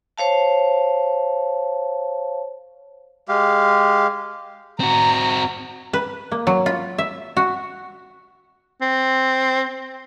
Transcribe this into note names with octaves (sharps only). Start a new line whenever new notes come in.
C5 C#5 F5 A5
G#3 G4 F5
C4 F#4 A#5
B4
A#3
F#3
F4
E5
F#4
C4